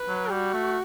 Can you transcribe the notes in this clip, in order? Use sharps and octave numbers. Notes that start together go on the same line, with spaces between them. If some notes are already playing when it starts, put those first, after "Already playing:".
Already playing: B4
F#3
G3 F#4
A3